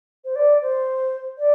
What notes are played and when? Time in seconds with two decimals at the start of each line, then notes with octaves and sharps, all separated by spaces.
0.25 C5
0.36 D5
0.62 C5
1.38 D5